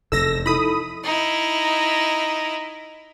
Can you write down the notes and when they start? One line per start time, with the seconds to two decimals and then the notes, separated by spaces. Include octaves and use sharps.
0.12 F1 E2 C3 A4 E6 A#6
0.46 D#4 E4 A4 B5 D#6
1.04 D#4 E4